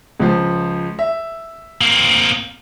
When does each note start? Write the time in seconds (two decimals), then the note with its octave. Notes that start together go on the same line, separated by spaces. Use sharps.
0.20 C#2 F3
0.99 E5
1.81 A#3 C4